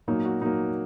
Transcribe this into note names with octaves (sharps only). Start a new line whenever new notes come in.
A#2 F#3 A#3 D#4
F#4
A#2 F#3 A#3 D#4